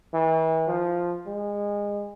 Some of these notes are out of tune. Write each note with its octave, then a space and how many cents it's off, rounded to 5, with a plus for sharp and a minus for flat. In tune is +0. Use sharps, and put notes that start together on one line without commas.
E3 -35
F3 +0
G#3 -25